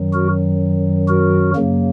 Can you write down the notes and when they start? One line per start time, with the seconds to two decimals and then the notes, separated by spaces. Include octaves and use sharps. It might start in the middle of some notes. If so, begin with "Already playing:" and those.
Already playing: F#2 D#3 F#3
0.14 F#4 A#4
1.09 F#4 A#4
1.56 F#2 C#3 F#3 A#3